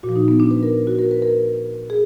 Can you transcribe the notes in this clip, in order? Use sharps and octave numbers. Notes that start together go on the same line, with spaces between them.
A#2 F#4
F3
D#4
B3
D4
B4
A#4
F#4
A#4
B4
A#4
G#4